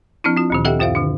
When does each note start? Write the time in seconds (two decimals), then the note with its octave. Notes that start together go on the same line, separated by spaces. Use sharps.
0.24 F3 C4 D4 E4
0.36 C4 F4
0.50 D2 A#2 D#3
0.65 G4 A4 D#5 E5 F#5 G5
0.79 F#2 F4 C5 E5 F5
0.95 D3 D4